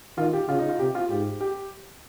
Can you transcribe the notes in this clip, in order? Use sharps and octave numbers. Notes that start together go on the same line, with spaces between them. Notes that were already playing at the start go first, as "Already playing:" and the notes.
D#3 F4
G4
C#3 F4
D#4
F4
C3 G4
F4
G#2 G4
G4